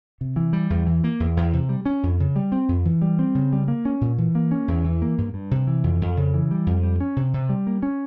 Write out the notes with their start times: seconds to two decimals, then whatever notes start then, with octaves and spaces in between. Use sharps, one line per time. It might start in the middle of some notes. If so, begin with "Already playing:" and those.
0.21 C3
0.36 E3
0.53 G3
0.70 E2
0.87 E3
1.04 A#3
1.20 E2
1.37 E2
1.53 C3
1.69 G3
1.86 C#4
2.03 F2
2.20 C#3
2.36 G3
2.52 C4
2.68 F2
2.85 E3
3.02 G3
3.19 C4
3.35 C#3
3.53 G3
3.68 A#3
3.85 C#4
4.01 A#2
4.18 E3
4.35 A#3
4.51 C#4
4.68 E2
4.85 E3
5.02 A#3
5.18 G2
5.34 G2
5.51 C3
5.67 E3
5.84 F2
6.01 F2
6.17 C#3
6.34 E3
6.51 G3
6.66 F2
6.83 G3
7.00 C#4
7.16 C3
7.34 C3
7.49 G3
7.67 A#3
7.83 C#4